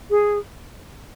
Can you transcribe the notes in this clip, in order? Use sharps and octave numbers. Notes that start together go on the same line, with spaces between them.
G#4